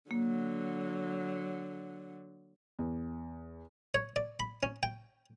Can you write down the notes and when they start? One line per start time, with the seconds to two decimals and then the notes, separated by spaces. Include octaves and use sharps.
0.11 D3 F#3 A#3
2.79 E2
3.94 C#5
4.16 D5
4.40 B5
4.63 C#4
4.83 G5